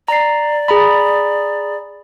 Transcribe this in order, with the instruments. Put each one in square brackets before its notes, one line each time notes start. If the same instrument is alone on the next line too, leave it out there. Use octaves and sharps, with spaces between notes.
[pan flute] D5 [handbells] A#5 C7
[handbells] G#4 A#5 B5